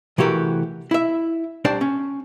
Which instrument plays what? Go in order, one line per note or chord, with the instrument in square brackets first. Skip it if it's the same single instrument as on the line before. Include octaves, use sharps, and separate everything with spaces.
[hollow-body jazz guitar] C3 E3 A3 F#4 G4 A#4
E4 E5
C2 D4 C5 D5 G5 A5
C#4